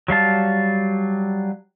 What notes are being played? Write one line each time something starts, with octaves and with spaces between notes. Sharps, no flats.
F#3 G3 F5 A5